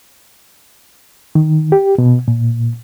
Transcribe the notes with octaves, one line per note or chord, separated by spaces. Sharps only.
D#3
G4
B2
A#2